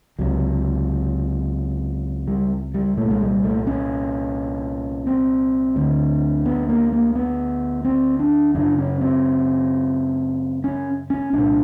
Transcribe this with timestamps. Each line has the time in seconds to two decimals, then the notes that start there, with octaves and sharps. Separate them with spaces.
0.19 C#2 C3 F#3
2.28 G3
2.74 G3
2.97 C2 A#2 A3
3.11 G#3
3.21 G3
3.44 A3
3.67 C#4
5.07 C4
5.76 D2 D3
6.46 B3
6.69 A#3
6.92 A#3
7.15 B3
7.85 C4
8.19 D4
8.55 F#2 C#3 D4
8.78 C#4
9.01 C4
10.64 C#4
11.10 C#4
11.33 C2 A#2 D4